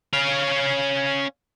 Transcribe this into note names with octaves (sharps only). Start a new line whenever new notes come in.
C#4 F5